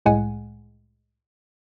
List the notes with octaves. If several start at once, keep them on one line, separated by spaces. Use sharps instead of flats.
C2 A2 G#3 F#5 G#5